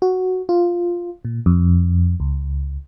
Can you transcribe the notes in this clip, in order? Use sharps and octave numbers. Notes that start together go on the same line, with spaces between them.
F#4
F4
A#2
F2
C#2